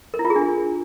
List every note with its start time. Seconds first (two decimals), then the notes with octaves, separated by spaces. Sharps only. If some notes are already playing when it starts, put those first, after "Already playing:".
0.14 A#4
0.19 E4
0.25 F4
0.30 G#4
0.36 D4